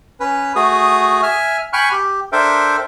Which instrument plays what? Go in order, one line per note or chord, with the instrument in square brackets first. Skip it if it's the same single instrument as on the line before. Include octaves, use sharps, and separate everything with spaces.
[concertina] C#4 B4
A3 F#4 G#4 D#6
E5 G#5 F6
G5 G#5 B5 C#6 F6 F#6
G4
D4 A4 A#4 C5 E5 G5